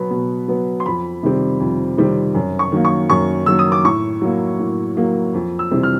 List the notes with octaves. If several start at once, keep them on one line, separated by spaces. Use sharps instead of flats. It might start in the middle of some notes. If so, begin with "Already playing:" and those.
Already playing: B2 F#3 B3 B5
B2
F#3 B3
C6
F2 B5
C3 D#3 G3 C4
F2
C3 D#3 G3 C4
F#2
C#6
D#3 F#3 A#3
C#6
F#2 C#6
D#3 F#3 A#3 E6
D#6
D6
A2 C#6
F#3 A#3
A2
F#3 A#3
F2
E6
C3 E3 G3 C4
F6